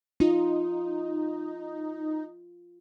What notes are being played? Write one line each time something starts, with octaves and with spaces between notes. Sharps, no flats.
D#4 F4